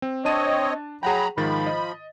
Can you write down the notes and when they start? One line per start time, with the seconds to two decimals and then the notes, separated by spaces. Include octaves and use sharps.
0.02 C4
0.25 C4 D4 C#5 D#5 A5 D#7
1.03 F#3 G#4 F#5 G5 A#5 B5
1.37 G#2 D#3 F3 B5 A6
1.67 D#5